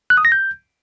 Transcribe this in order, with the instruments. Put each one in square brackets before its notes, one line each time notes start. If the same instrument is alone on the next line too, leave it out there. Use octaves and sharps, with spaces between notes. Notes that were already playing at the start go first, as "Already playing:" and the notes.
[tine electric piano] F#6
D#6
A#6
G6